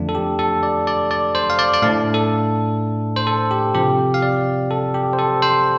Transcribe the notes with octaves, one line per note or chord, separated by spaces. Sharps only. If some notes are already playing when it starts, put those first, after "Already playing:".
Already playing: F2 D3 F3 A3 D4
A4
G4
A4
D5
D5
D5
C5
F5
D5
D5
A2 A3 D4 F5
A4
C5
A4
G4
C3 F3 C4 G4
F5
D5
A4
G4
C5
A4
C5